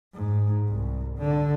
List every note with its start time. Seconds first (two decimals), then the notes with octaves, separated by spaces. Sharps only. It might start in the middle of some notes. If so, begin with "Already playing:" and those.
0.14 G#2
0.69 C2
1.18 D3